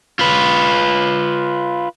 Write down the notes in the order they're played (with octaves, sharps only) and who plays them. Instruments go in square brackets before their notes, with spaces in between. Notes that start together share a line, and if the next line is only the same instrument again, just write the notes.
[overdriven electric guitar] F4 B4